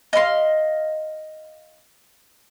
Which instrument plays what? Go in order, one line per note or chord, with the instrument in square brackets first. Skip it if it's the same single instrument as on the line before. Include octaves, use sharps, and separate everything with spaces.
[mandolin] D#5 F5 B5 C6